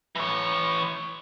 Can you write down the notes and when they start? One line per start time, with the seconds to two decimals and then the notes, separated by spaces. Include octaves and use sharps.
0.15 E3 C#5